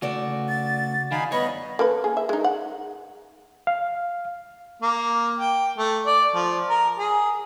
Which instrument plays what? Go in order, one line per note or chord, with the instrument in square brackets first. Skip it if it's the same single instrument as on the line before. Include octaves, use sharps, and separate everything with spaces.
[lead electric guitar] C#3 A3 [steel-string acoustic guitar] F#4 D5
[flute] A6
[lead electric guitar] D#3 [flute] D#4 [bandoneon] F5 G#5 B5
[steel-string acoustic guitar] G2 [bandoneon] B3 D#5 [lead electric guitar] C#5 [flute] B5
[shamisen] A#3 A4 B4
G#4
E5
G#3 D#4
F#5
[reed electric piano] F5
[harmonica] A#3
G5
A3
D5
F3
A#4
G#4